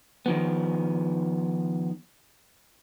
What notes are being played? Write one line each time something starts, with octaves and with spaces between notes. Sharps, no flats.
D#3 F3 B3